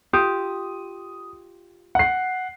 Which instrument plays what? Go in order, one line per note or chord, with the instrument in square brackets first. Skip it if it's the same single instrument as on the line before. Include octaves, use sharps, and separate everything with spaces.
[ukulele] F4 G4 [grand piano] D#6
[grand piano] F#5 C7